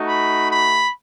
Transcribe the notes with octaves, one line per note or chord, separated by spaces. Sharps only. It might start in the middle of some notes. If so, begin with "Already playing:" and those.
Already playing: A3 D#4 F#4
B5
B5